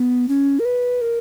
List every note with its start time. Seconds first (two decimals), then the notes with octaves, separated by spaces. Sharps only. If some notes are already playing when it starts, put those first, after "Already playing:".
Already playing: B3
0.28 C#4
0.59 A#4
0.65 B4
1.01 A#4